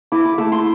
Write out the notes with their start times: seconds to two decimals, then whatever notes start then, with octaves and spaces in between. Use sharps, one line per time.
0.12 E4 D6
0.25 D6
0.38 A3 E6
0.52 C6